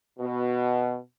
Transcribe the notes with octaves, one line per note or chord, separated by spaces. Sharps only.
B2